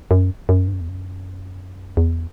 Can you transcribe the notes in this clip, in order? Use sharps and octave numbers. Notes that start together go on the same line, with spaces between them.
F#2
F#2
G2
F#2
E2
F#2
E2